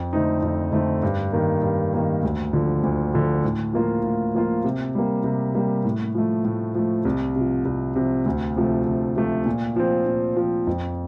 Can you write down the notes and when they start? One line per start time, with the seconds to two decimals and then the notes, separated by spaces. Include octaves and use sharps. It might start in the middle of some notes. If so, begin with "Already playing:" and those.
Already playing: F2
0.13 D3 A3 C4 D#4
0.42 F2
0.72 D3 A3 C4 D#4
1.03 G2
1.32 D#3 A#3
1.62 G2
1.93 D#3 A#3
2.23 D2
2.53 D3 F3
2.83 D2
3.14 D3 F3
3.44 A2
3.73 F3 A#3 F4
4.04 A2
4.34 F3 A#3 F4
4.64 C3
4.95 G3 A#3
5.24 C3
5.55 G3 A#3
5.84 A2
6.15 F3 A3
6.45 A2
6.75 F3 A3
7.05 C2
7.36 C3 F3
7.65 C2
7.96 C3 F3
8.26 D2
8.56 C3 F3 A3
8.87 D2
9.16 C3 F3 A3
9.46 A#2
9.76 F3 C4
10.06 A#2
10.36 F3 C4
10.67 F2